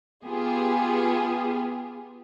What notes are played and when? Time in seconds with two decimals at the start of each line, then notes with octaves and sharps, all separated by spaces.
0.25 B3 F4 G4 G#4